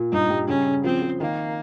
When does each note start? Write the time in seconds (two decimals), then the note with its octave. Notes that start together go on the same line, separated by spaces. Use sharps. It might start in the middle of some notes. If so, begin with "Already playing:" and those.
Already playing: A#2
0.12 G2 D#4
0.30 G3
0.48 C#3 C#4
0.66 C#3
0.84 F3 C4
1.02 F3
1.20 D#3 A#3